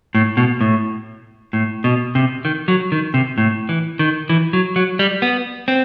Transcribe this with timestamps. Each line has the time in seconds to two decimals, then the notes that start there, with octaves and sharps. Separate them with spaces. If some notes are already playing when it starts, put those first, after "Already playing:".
0.15 A2
0.37 B2
0.61 A2
1.53 A2
1.84 B2
2.15 C3
2.45 D#3
2.68 F#3
2.92 D#3
3.14 C3
3.38 A2
3.69 E3
3.99 D#3
4.30 E3
4.53 F#3
4.76 F#3
4.99 G3
5.22 B3
5.68 C4